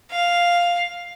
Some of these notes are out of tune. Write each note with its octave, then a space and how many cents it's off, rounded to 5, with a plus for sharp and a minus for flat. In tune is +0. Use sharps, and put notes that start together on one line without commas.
F5 +0